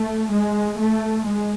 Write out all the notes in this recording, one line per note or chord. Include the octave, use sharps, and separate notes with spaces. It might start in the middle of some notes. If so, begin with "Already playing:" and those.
Already playing: A3
G#3
A3
G#3